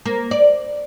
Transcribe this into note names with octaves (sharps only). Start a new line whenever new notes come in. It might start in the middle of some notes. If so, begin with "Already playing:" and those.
A#3
D5